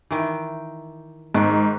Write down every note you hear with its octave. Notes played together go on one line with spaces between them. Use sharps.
D#3 E3
G#2 D#3